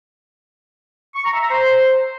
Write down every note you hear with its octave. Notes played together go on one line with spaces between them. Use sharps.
C#6
A#5
E5
A#5
C5